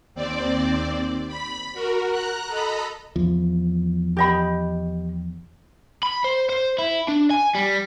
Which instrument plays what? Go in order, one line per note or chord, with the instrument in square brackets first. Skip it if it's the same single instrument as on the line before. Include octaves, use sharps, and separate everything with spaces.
[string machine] D#2 C4 D5
B5
F#4 A#4
A#5 F#6
A4 D#5 A#5 B5
[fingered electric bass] E2 F3
[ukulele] G4 D#5 B5
[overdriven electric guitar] B5
C5
C5
E4
D4
G#5
G3